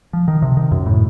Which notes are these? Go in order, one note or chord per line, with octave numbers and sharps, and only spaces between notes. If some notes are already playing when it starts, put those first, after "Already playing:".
F3
D#3
C3
D#3
F#2
A2